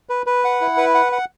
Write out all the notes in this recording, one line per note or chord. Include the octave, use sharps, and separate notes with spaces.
B4
B4
F#5
E4
B4
F#5
F#5